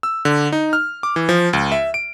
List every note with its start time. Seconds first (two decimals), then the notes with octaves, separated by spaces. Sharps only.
0.03 E6
0.25 D3
0.52 D#4
0.73 F6
1.03 D6
1.16 E3
1.29 F3
1.53 C#2
1.72 E5
1.94 D7